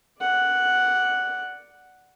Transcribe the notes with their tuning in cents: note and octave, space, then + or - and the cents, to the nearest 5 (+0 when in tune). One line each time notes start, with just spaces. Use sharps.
D5 +0 F#5 +0